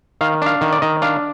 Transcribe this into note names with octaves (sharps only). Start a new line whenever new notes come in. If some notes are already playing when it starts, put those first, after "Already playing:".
D#3 F5
D4 F5
D#3
D5
D#3 D#5
D4 F5